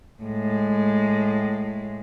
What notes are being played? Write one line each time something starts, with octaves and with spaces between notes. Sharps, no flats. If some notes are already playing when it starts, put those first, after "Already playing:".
A2 G#3